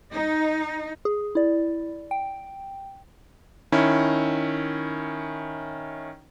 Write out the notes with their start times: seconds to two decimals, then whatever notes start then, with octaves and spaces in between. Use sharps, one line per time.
0.14 D#4
1.05 G#4
1.35 E4 D5
2.11 G5
3.72 D#3 C#4 E4